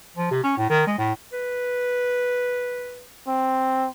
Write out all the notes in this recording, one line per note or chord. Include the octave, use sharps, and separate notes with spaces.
F3
C3
C#4
A2
D#3
G#3
A2
B4
C4